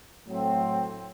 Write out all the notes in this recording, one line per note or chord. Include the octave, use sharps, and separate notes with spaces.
A2 F#3 A3 C4